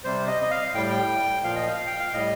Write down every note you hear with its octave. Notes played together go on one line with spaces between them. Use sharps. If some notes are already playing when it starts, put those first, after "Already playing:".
C3 G3 C5
D#5
D#5
F5
A2 G3 G5
G5
A#2 F3 F5
D#5
F5
G5
F5
A2 G3 D#5